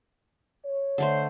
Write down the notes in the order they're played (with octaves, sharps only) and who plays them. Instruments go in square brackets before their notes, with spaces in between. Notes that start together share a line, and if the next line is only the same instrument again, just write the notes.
[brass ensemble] C#5
[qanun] D3 A3 C5